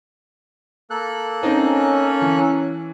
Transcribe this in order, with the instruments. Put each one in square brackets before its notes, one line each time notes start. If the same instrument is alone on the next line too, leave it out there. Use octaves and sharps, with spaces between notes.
[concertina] A#3 A4 F#6
[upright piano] C4 D#4 [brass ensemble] C#4
[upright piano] E3